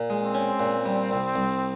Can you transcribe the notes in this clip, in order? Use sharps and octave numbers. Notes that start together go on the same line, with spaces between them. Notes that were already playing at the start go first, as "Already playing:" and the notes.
Already playing: A#2
G#3
C4
C#4
A#2
G3
C2
C2